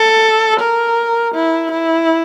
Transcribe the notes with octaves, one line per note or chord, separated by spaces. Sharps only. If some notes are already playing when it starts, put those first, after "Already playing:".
Already playing: A4
A#4
E4
E4